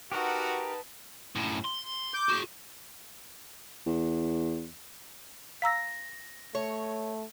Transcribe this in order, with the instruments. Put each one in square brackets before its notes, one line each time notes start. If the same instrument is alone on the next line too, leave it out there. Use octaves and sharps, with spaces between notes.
[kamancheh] D#4 F#5 [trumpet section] F#4 [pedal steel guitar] G4 A#4 [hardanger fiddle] B4 A5
[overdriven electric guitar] F#2 A2
C6
[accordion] D6 G6
[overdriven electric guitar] F#4 G#4
[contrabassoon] E2
[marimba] F5 A#5 E6 [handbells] A#6 B6
[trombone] A3 [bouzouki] C#5